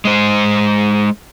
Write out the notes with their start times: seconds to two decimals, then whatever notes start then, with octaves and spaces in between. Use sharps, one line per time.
0.05 G#3 C5